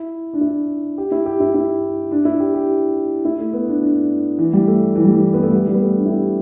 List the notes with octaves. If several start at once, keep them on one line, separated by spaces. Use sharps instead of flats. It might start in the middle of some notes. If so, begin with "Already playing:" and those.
Already playing: E4
D4
E4
G4
E4
G4
E4
E4
D4
E4
G4
G4
E4
A3
B3
D4
D4
E3
G3
A3
E3
G3
E3
B3
A3
G3
G3
B3
A3
D4
E4
G4